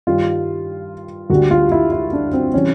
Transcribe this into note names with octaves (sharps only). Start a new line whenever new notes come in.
G2 D#3 G3 F4
D2 D3 G3 F#4
F4
E4
E4
D4
C4
C3 E3 G3 C#4